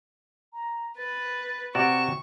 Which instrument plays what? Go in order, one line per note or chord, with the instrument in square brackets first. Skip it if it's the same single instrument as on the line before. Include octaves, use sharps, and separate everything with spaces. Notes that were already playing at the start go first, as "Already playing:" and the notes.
[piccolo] A#5
[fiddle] B4 [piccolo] A6
[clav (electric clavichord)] C3 F#4 D5 [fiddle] C#6 [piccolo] E7